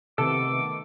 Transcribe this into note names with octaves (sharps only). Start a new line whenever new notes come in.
C3 D#3 A3 B3 A4 D6